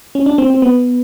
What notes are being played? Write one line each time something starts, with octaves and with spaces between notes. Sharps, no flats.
C#4
D4
C4
C4
B3